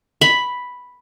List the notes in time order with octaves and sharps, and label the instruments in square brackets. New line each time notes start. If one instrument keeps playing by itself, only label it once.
[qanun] B5